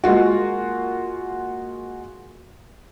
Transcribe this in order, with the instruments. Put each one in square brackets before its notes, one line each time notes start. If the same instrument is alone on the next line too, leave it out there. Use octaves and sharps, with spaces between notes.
[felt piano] G#3 A#3 F4 F#4